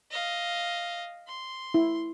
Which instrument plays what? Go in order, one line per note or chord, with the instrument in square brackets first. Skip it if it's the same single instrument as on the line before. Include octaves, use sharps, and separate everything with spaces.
[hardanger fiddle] D#5 F5
C6
[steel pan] E4